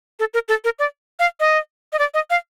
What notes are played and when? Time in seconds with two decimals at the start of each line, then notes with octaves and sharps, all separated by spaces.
0.20 A4
0.34 A#4
0.48 A4
0.64 A#4
0.79 D5
1.19 F5
1.40 D#5
1.93 D#5
1.99 D5
2.14 D#5
2.30 F5